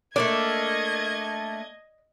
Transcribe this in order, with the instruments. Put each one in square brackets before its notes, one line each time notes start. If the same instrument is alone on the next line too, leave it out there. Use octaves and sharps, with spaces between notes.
[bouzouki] A3 A#3 D4 [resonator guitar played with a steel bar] D5 [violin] D#5 G#6